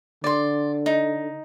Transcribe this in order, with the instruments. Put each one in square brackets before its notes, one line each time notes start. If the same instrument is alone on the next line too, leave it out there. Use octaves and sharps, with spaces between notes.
[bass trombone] D3 [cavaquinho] D5 C6
[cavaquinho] D#4